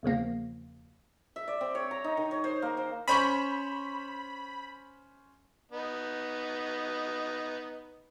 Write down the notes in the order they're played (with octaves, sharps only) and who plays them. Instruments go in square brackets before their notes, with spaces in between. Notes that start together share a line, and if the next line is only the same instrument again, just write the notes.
[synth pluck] E2 C#3 F3 A#3
[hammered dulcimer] E5
D5
C4
C#5
A#5
D#4
D#3
C#5
C5
A#3
C5
[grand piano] C#4 C5 C#6 [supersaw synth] B5
[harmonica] B3 D#4